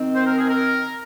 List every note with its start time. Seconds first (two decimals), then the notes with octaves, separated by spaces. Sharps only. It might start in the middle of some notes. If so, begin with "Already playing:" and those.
Already playing: D#3 C4
0.14 C5
0.25 A#4
0.36 G#4
0.48 A#4